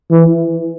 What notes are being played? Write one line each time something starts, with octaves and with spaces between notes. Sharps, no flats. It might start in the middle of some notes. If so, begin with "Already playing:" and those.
E3